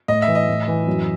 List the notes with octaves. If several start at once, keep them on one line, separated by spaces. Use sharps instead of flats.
A2 D#5
E5
E3
D#5
A2
E3
F#2